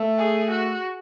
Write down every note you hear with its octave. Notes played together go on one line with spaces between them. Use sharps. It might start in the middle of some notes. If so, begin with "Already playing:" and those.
Already playing: A3
G#4
F#4